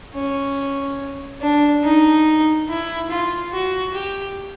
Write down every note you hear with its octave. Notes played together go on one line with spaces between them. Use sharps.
C#4
D4
D#4
E4
F4
F#4
G4